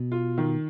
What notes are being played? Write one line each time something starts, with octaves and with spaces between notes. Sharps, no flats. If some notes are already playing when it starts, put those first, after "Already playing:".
Already playing: B2
F4
D#3